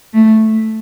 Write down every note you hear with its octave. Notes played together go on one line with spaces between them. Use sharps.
A3